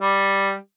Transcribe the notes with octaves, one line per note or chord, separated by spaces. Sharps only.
G3